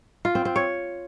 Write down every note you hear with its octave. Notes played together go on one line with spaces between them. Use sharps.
F4
C4
C4
C#5